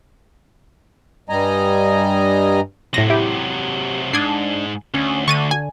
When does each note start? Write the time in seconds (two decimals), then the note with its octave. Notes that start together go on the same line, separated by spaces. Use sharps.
1.29 G2 G3 D#5 G#5 A#5
2.94 A2 C3 F#3 A#6
3.10 E4 G4
4.13 G#2 D4 D#6 G#6 C7
4.94 D2 C#4
5.28 D3 C#6 A6 D#7
5.51 G#5